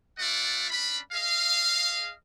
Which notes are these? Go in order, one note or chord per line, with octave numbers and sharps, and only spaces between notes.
A3 F4 D5 E5 F#5
C#4 D4 B5
G#4 D#5 F5